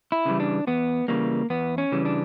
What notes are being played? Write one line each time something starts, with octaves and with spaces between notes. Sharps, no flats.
E4
C#3 E3 G3
D4
E2 B3
C#3 E3 G3 A#3
E2 B3
C#4
C#3 E3 G3
D4